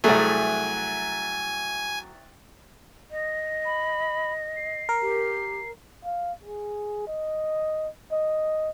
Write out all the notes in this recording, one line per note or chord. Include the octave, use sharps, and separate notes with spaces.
C2 F#3 A3 G#4 G#5
D#5
B5
C7
A#4
G4
F5
G#4
D#5
D#5